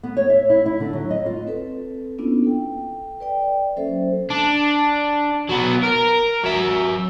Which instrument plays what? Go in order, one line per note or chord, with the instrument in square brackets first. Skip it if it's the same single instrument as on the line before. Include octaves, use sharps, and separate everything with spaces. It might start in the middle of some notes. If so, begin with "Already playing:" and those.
[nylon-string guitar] B3
C#5
E5
E4
E4
D3
F#3
D#5
F4
[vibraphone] C4 A4 B4
A#3 B3 C#4 D4 E4 F4
A4 G5
B4 D5 G5
F#3 A#3 C#4 A4 C5 E5
[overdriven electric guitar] D4
F#3 B3
A#4
F#3 E5